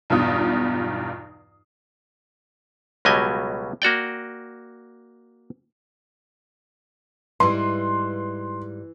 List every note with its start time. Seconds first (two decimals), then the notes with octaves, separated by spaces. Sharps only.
0.10 B1 E2 G2 F4 D#6
3.05 C#2 B2 F#3 G3 D#5 G#5
3.82 A#3 F#4 D5 G5
7.40 G#2 E3 G3 C6